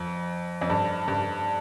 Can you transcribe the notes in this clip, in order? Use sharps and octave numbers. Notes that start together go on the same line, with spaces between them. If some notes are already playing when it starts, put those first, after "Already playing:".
Already playing: F2
F2
G2
G2